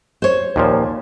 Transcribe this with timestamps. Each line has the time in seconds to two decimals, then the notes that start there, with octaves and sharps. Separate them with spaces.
0.22 C5 C#5
0.56 D#2 A#2 F3